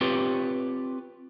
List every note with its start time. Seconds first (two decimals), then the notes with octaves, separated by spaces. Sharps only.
0.01 C4 F4 G4 B4 C#5